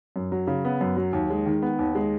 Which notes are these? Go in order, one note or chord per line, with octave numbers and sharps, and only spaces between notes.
F#2
F#3
C#3
B3
F#2
F#3
D#2
G#3
D#3
B3
D#2
G#3